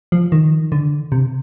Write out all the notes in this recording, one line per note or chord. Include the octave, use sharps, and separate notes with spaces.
F3
D#3
D3
C3